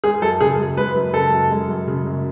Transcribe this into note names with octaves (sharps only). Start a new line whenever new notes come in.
G#3 G#4
F#2 A4
C#3 G#4
F#2
G#3 B4
F#2
C#3 A4
F#2
G#3
F#2
C#3
F#2